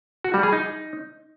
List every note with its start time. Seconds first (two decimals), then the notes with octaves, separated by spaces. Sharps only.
0.24 F#4
0.34 G3
0.43 G#4
0.53 D#4